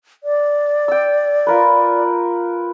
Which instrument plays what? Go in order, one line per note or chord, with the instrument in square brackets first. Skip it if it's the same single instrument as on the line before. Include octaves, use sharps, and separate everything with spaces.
[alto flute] D5
[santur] G5 E6
F4 A#4 B4